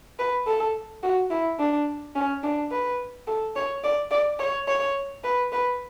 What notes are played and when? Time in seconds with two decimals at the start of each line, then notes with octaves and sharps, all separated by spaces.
0.19 B4
0.47 A4
1.03 F#4
1.31 E4
1.59 D4
2.15 C#4
2.43 D4
2.71 B4
3.27 A4
3.56 C#5
3.84 D5
4.11 D5
4.39 C#5
4.68 C#5
5.24 B4
5.52 B4